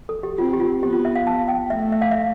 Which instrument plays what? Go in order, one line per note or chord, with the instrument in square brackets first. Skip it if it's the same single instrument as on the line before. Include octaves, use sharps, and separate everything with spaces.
[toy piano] A4
G4
[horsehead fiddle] C4 [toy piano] F4
[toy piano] G4
F4
[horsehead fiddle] B3 [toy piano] G4
[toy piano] F4
E5
F5
A5
G5
[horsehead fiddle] A3 [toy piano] E5
[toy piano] E5
F5
E5